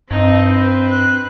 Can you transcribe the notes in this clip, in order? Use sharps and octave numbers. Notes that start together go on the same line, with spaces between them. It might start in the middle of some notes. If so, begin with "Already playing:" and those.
G2 C4 D#4
B4 C5
F#6